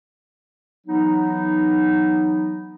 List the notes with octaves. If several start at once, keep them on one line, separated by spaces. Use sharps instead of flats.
E3 F#3 B3 D#4